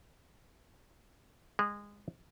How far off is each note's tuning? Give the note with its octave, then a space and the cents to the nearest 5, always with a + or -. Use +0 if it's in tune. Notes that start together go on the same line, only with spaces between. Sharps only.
G#3 -20